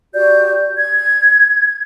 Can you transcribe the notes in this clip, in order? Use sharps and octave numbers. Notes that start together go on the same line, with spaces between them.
F#4 G4 D5 G6
G#6